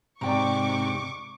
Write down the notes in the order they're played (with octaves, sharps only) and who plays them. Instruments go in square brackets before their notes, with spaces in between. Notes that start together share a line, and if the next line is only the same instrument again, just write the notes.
[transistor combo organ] G#2 C3 [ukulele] D5 G5 A#5 [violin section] C#6 D6